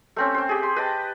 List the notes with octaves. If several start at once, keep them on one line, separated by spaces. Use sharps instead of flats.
A3 C4 C#4
C5 G5
G4 G#4
C6
B4 D#5 G5 A5